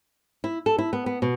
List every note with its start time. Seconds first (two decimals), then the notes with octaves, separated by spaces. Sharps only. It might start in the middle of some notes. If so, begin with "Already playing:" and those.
0.44 E4
0.66 A4
0.78 E4
0.93 B3
1.06 B3
1.22 B2